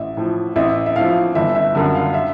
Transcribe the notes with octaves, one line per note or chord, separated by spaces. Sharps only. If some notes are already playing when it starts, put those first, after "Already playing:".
Already playing: A1 E5
A2 F3
A1 E5
E5
A2 F3 F5
G1 E5
E5
F#2 D3
F5
E5